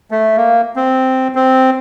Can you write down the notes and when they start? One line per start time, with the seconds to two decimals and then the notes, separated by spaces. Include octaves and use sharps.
0.11 A3
0.37 A#3
0.76 C4
1.35 C4